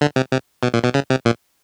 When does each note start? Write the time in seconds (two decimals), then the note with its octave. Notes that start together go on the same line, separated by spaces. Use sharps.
0.01 D3
0.16 C3
0.32 C3
0.63 B2
0.74 A#2
0.84 B2
0.94 C#3
1.10 C3
1.25 A#2